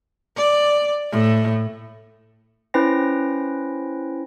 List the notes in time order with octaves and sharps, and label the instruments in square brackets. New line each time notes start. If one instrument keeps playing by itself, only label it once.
[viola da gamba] D5
A2
[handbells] C#4 E4 B4 C5 G5 A#6